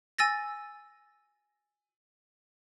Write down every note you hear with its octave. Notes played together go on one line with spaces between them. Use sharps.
G#5 E6 A6 A#6